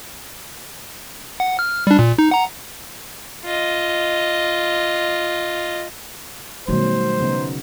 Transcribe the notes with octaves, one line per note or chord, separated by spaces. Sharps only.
F#5
F6
G3 D4
A#2
D#4
F#5 A#5
F4 D#5
B2 D#3 F#3 G3 A3 C5
C#3 B3 D#4